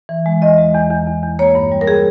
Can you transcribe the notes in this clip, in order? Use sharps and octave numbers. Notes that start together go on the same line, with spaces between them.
E3
G#3
E2 D#5
G#3
E2
E2
E2
E2
A#3 C#5
G2
G3
A#4
G3 G#4